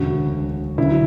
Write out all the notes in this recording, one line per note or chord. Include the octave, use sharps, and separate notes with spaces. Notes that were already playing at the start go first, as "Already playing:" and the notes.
Already playing: E1 D2 C#3 F#4
D2 C#3 F#3 E4